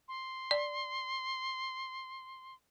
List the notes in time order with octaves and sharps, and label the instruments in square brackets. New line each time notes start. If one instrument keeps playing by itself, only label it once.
[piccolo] C6
[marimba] D5